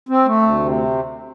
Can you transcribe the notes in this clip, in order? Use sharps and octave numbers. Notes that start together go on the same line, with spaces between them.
C4
A3
D2
C3